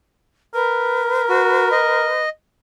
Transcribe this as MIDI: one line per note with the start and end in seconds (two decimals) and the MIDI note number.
0.54 2.11 70
0.54 2.23 71
1.29 1.69 66
1.72 2.29 75